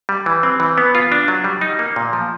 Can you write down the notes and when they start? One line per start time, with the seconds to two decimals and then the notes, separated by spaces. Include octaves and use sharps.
0.09 G3
0.26 E3
0.43 C4
0.60 E3
0.78 B3
0.95 F4
1.12 D4
1.28 F#3
1.44 G3
1.61 D#4
1.79 A#3
1.96 A#2
2.13 F3